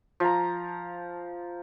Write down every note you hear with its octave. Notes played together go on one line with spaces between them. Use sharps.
F3 A#5